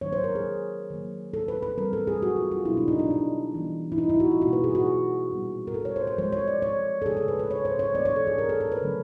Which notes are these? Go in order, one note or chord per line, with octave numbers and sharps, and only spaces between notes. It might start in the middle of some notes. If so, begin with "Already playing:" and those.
D#3 F#3 A#3 D4 C#5
C5
A#4
G#4
D#3 F#3 A#3
A4
B4
B4
E3 G3 C4 A#4
A4
G#4
F#4
F4
F4
B2 F#3 B3 D4 E4
D4
D#4
D4
D4
E3 G3 B3
E4
D#4
E4
F#4
F4
B2 G3 A#3 D4 F#4
B4
G#4
F#4
G#4
A#2 G3 B3 D4
A#4
A4
C#5
C5
C5
F3 G#3 C4 C5
C#5
D5
C#5
A4
C#3 F3 G#3 C#4 G#4
A4
B4
B4
C#5
C5
C#5
E3 G#3 B3 D4 D5
C#5
A4
G#4
A#4
A4
A#4
B4
D3 F#3 A3 C#4